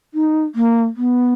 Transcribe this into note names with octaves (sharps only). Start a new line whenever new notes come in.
D#4
A#3
B3